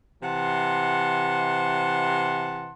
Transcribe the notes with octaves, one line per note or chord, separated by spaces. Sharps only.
C3 E3 F#5 A5 C6